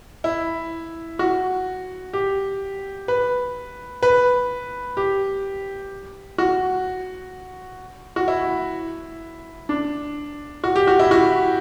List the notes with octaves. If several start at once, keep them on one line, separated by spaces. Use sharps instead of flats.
E4
F#4
G4
B4
B4
G4
F#4
F#4
E4
D4
F#4
G4
F#4
E4
F#4